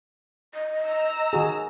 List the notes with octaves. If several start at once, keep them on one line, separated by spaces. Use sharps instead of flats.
D#5
A#5 E6
D#3 F#4 G#4